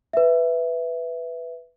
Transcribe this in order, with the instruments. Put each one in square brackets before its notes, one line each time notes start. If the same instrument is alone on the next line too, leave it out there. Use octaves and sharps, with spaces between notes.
[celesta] B4 E5